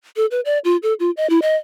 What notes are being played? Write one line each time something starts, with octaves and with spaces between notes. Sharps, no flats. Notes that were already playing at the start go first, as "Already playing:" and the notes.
A4
B4
D5
F4
A4
F4
D#5
E4
D#5